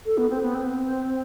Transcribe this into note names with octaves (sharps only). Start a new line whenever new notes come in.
A4
B3
C4
B3
C4